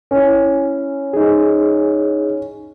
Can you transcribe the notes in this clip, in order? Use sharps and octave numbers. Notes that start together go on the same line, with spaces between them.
C#4 E4
D#4 G#4